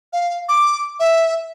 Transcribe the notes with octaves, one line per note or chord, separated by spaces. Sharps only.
F5
D6
E5